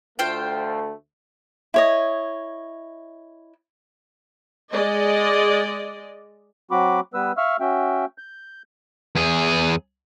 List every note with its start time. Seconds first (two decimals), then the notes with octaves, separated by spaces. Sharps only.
0.19 D2 A3 F4 C5 G5
1.74 E4 C#5 D#5
4.72 G#3 D5 D#5
6.71 F#3 C4 F#4 B5 D6
7.14 G3 B3 B4 E6
7.38 E5 F5 C#6 E6 F6
7.60 C#4 F#4 E5 G5
8.18 G6
9.15 E2 G#4